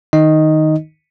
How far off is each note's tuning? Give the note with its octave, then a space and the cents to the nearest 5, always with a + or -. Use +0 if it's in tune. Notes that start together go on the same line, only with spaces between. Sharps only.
D#3 +0 D#4 +0 D#5 +0